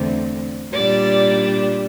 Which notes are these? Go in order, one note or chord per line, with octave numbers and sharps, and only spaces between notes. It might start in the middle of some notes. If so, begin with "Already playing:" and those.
Already playing: E2 D3 A3 C4
A#2 G3 D4 D5